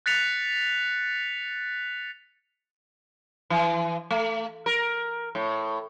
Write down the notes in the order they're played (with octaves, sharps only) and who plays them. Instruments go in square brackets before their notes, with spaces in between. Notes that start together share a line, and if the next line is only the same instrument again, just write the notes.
[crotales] F#6 A6 B6 C#7 F7
[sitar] E3
A3
A#4
A2